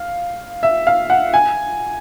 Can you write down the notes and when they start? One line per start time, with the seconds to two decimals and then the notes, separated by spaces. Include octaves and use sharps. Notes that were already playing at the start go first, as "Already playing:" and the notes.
Already playing: F5
0.63 E5
0.87 F5
1.10 F#5
1.34 G#5